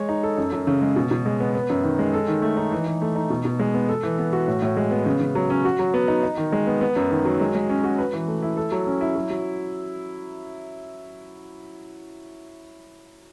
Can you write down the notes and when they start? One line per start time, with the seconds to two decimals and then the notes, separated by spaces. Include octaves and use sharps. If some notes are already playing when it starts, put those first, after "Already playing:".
Already playing: G#3 C#5
0.09 D#4
0.23 A4
0.38 F#2
0.52 F#2
0.67 C#3
0.82 G#3
0.96 B2
1.11 B2
1.26 G#3
1.40 B3
1.55 B3
1.70 F#2
1.84 D#3
1.99 G#3
2.14 A4
2.28 D#3
2.42 A3
2.57 D#4
2.72 E3
2.86 E3
3.02 A3
3.16 D#4
3.30 B2
3.45 B2
3.59 G#3
3.74 B3
3.89 A4
4.03 E3
4.18 B3
4.33 F#4
4.48 A2
4.62 A2
4.77 G#3
4.91 B3
5.06 C#3
5.21 C#3
5.35 F#3
5.50 C#4
5.65 F#4
5.79 F#3
5.94 B3
6.08 D#4
6.23 D#4
6.38 D#3
6.52 G#3
6.67 B3
6.81 B3
6.96 F#2
7.11 D#3
7.25 F#3
7.40 G#3
7.55 G#3
7.70 C#4
7.84 F#4
7.98 B4
8.13 E3
8.28 A3
8.42 E4
8.57 A4
8.72 F#3
8.87 C#4
9.01 E4
9.16 F#3
9.30 F#3